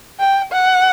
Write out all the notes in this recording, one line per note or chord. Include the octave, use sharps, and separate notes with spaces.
G5
F#5